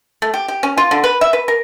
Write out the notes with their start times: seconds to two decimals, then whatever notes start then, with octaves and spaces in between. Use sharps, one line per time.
0.22 A3
0.34 G4
0.48 G4
0.63 C#4
0.78 F4
0.91 D3
1.04 B4
1.21 E5
1.33 B4
1.48 A#4